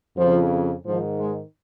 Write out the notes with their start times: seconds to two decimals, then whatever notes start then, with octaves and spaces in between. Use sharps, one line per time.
0.17 F2 C#3 F3
0.86 G#2 D#3 F3
1.20 G#3